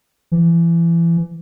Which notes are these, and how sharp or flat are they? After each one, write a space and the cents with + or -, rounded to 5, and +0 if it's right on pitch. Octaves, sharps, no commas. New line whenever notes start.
E3 +30